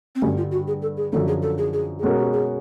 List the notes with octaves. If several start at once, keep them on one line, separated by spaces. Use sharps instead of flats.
C4
G2 D3 G3 C#4
F4
F#4
G#4
A4
G#4
F#2 D3 F3 A4
G#4
A4
G#4
G#4
G#4
B2 G#3 C#4 F#4 A4 A#4
G4
G#4